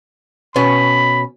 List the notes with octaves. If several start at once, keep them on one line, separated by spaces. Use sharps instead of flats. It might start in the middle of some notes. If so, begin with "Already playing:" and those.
B2 B3 C#4 B5